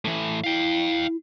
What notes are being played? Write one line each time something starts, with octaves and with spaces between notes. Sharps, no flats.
A2 E3
E4 F5 G5